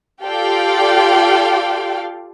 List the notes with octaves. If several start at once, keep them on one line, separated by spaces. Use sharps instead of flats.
F4 G4 A4 D5 F5 G5